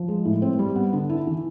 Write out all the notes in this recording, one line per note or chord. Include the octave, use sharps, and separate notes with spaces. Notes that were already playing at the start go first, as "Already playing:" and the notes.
Already playing: F3
G#3
A2
C4
G3
B3
D3
E4
E3